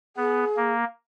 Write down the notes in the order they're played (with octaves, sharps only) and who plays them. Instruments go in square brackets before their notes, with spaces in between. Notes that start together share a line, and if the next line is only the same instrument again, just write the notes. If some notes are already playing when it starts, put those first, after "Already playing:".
[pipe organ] B3 [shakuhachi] G#4
[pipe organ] A#3